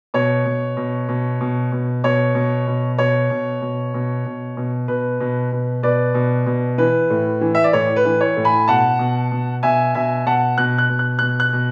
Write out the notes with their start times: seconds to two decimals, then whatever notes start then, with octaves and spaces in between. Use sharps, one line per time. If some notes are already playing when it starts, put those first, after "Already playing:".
0.14 B2 C#5
0.46 B2
0.77 B2
1.09 B2
1.41 B2
1.72 B2
2.04 B2 C#5
2.35 B2
2.67 B2
2.98 B2 C#5
3.30 B2
3.62 B2
3.94 B2
4.25 B2
4.57 B2
4.88 B2 B4
5.20 B2
5.52 B2
5.83 B2 B4 D5
6.14 B2
6.46 B2
6.78 E3 B4
7.10 A2
7.41 E3
7.55 E5
7.64 D5
7.73 A2 C#5
7.96 B4
8.05 E3
8.21 C#5
8.37 A2
8.44 G#5 B5
8.68 B2 F#5 A5
8.99 B2
9.32 B2
9.63 B2 E5 G#5
9.95 B2 E5 G#5
10.26 B2 F#5 A5
10.58 B2 F#6
10.78 F#6
10.90 B2
10.99 F#6
11.19 B2 F#6
11.40 F#6
11.53 B2